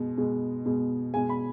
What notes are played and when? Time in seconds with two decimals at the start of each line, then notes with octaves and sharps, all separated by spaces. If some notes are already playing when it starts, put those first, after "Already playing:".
Already playing: B2 G#3
0.18 B2 G#3
0.66 B2 G#3
1.14 B2 G#3 G#5
1.29 B5